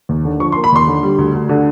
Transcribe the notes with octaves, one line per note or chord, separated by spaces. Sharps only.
D#2
D3
F3 C#6
C6
A#3
B5
D#2 C6
D3
G3
D2
D2
D3